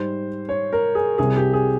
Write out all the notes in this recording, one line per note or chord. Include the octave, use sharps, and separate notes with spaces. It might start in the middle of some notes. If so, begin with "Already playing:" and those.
Already playing: G#2 G3 C5
C#5
A#4
G#4
C2 C3 G3 G#4
G4
G#4